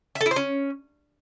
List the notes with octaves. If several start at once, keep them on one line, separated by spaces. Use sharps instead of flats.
E5
A4
E4
C5
C#4